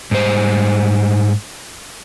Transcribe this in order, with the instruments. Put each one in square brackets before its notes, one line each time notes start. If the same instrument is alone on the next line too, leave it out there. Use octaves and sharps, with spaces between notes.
[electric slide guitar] G#2 G3 C5